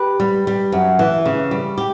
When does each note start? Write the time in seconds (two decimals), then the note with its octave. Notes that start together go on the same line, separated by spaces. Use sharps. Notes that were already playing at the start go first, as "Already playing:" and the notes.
Already playing: G4 B4
0.20 G3
0.47 G3
0.72 F#2
0.99 E3
1.26 C#3
1.51 G3
1.78 G4